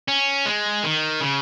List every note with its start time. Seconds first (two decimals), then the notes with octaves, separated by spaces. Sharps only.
0.08 C#4
0.46 G#3
0.84 D#3
1.20 C#3